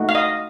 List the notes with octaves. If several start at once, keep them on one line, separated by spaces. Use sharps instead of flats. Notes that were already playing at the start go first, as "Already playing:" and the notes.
Already playing: A3 D#4 F#4
F5
D#5